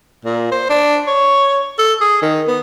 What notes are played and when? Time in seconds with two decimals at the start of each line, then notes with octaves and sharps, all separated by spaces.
0.25 A#2
0.52 C5
0.70 D4
1.07 C#5
1.79 A4
2.01 G#4
2.22 D#3
2.48 B3